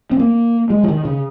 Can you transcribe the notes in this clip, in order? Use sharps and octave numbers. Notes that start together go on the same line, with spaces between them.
C4
A#3
G#3
F3
D#3
C#3